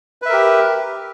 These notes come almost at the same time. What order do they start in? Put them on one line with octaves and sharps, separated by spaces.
B4 E5 A#4 G4